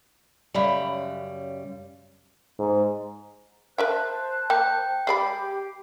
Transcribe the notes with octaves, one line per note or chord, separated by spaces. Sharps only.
F#2 C#3 G3 D5 B5
G#2
A#4 C5 E5 G5 A5 F#6
A#3 G5
G#3 G4 D5 G5 B5 C7